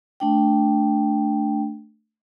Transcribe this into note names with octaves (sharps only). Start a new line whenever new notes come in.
A3 D4 G5